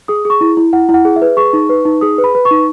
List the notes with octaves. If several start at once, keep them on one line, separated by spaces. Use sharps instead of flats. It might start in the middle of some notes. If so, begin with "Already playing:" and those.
G#4 D#6
G#4 C#6
E4
E4
E4 F#5
E4
F#5
G#4
E5
B4
G#4 C#6
D#4
B4
D#4
G#4 D#6
B4
B5
B4
C#6
D#4